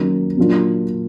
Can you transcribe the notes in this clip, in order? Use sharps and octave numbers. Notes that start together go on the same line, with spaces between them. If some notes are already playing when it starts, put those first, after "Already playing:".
Already playing: D#3 F#3 A#3 C#4
A#2 F#3 A#3 D4 F4